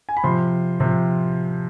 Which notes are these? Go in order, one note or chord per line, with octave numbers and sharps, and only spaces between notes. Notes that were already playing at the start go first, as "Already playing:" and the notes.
G#5
B5
C3 F3 C6
C3 F3